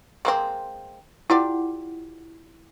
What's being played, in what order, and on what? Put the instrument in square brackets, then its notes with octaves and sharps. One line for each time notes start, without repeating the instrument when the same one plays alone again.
[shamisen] G#3 A#3 C4 [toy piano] C6
[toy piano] E4 F#5 [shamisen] F4 G4 D5